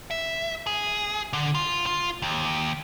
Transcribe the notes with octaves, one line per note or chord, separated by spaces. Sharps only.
E5
G#4
D3
F4
F4
D#2